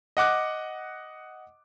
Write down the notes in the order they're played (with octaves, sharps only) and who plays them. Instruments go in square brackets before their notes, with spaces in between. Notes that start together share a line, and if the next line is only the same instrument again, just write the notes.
[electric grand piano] D#5 F#5 D6 F#6